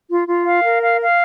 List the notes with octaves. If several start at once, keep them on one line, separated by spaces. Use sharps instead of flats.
F4
F4
F5
A#4
F5
F5